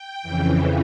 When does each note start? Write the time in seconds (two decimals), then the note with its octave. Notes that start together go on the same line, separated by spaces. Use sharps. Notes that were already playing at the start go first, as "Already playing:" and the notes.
Already playing: G5
0.23 F2 C#3 E3